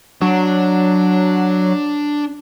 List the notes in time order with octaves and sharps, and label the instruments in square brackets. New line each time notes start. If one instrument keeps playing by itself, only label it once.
[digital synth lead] F#3 [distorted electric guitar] D4